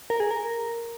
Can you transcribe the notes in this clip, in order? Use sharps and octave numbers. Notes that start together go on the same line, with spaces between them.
A#4
G#4
A#4